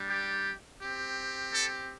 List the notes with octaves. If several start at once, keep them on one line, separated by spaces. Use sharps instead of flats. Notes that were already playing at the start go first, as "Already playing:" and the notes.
Already playing: G3 D4
G4
C4 G4
A4